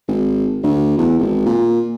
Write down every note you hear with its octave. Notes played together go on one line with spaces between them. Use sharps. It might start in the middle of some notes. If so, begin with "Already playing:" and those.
G#1
D2
E2
G#1
A#2